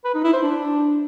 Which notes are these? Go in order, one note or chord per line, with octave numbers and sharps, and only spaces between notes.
B4
D#4
E4
C5
D4